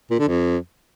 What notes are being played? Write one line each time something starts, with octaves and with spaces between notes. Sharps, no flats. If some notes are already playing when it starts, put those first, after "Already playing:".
A#2
D3
F2